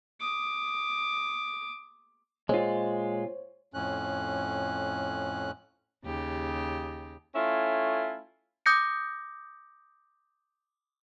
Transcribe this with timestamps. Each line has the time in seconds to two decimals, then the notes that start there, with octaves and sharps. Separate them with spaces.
0.20 D6 D#6
2.49 A#2 G#3 F4 C5 C#5
3.74 F2 A2 C#4 F#6
6.04 D#2 C#3 G4
7.34 A3 C#4 E4 F4
8.66 D6 D#6 G6 A#6 C#7